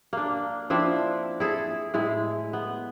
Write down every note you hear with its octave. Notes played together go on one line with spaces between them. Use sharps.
A#3 D4
F3 C4 D4 E4
E4 G#4 A4
A2 G#3 E4
B3